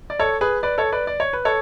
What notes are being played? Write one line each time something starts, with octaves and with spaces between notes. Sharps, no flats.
D5
A4 C#5
G#4 B4
B4 D5
A4 C#5
B4 D5
D5
C#5
B4
A4 C#5